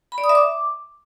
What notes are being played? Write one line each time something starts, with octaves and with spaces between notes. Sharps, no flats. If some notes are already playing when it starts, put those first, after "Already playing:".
B5
D5
D#6
E5
D6